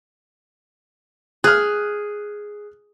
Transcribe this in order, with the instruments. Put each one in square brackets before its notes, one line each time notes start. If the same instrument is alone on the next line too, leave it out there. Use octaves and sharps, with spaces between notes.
[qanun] G#4 [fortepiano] F6 F#6